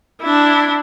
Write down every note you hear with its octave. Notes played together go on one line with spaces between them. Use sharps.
D4 E4